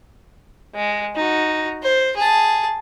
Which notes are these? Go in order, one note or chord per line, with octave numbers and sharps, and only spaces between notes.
G#3
D#4 F#4
C5
G#4 A5